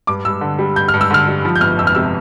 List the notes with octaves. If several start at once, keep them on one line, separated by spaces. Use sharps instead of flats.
G2 D6
G2 E6
D3
G3
G2 G6
F6
G2
E6
D3 F6
G3
F3
G6
G1 F6
F2 E6
F6
C3 E6